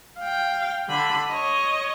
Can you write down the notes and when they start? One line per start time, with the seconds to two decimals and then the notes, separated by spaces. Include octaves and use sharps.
0.19 F5 G5
0.89 D3 B5
1.28 C#5 D#5